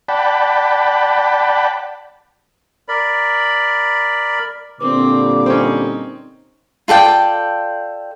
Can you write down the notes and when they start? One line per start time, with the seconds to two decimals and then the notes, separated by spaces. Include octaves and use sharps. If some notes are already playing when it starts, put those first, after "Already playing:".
0.08 D5 F#5 G5 A5 B5
2.88 A#4 D5 B5
4.80 A#2 D3 G3 C4 D6
5.46 C4 C#4 D#4
6.88 F4 A4 D5 G5